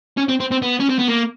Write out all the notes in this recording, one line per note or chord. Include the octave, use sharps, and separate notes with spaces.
C#4
C4
C4
C4
B3
C#4
C4
B3
A#3